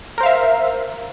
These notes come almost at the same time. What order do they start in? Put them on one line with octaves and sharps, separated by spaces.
A#4 C5 F5 E5